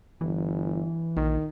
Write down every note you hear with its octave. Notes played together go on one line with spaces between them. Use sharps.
G1 E3
A#1 D#3